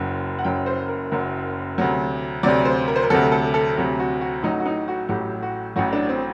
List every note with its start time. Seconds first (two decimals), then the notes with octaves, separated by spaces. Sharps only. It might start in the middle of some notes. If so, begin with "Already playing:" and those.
Already playing: F#1 F#2 F#3
0.39 F#5
0.44 F#1 F#2 F#3 G5
0.66 C5
0.88 A#4
1.12 F#1 F#2 F#3
1.78 D2 C3 F#3
2.43 D2 C3 F#3 D5
2.65 C5
2.88 A#4
2.96 C5
3.03 A#4
3.10 D2 C3 F#3 A4
3.32 A4
3.54 A4
3.77 D2 C3 F#3 G4
3.99 F#4
4.21 F#4
4.43 A1 A2 F#3 D#4
4.60 F#4
4.66 D#4
4.88 F#4
5.09 A1 A2 F#3 G4
5.42 F#4
5.76 A1 A2 F#3 F#4
5.93 D4
6.09 C4